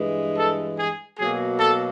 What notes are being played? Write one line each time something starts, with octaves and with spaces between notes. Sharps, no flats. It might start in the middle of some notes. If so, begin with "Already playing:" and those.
Already playing: G2 E3 G#3
A4
G#4
B2 F#3 A#3 G#4
A4